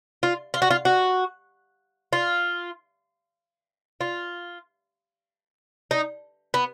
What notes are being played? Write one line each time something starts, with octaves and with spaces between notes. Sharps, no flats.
F4
F4
F#4
F4
F#4
F4
F4
D#4
B3